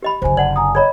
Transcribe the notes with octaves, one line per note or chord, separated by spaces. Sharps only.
G4 D#5 B5
F#1 D3 C5 G#5
D5 F#5 A5 F#7
G#5 A#5 D#6
G#4 C#5 D#5 A#5 B5 G#6